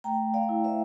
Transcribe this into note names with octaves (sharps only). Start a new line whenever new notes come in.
A3 G5 A#5
D5 F5
E4
C5 E5